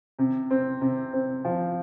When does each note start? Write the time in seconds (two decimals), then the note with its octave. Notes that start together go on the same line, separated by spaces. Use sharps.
0.19 C3
0.50 C4
0.81 C3
1.13 C4
1.45 F3